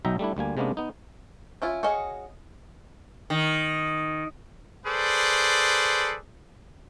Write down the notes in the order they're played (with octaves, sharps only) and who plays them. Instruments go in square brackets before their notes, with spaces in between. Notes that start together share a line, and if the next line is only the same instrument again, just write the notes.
[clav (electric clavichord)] B1 F#3 D#4 E5 G5 A#5
G3 A3 D4 E4
D2 G3 A#3 G#5
C3 G#3 A#3 B3 C#4 D4
B3 D#4
[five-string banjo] C#4 E4 F4
F#4 G#4 C#5 D#5 F5
[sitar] D#3
[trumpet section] G#4 A4 B4 C5 D5